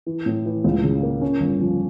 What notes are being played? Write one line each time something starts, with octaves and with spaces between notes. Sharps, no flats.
E3
A2
E3
C#2
C#3
A#3
C#4
G1
F3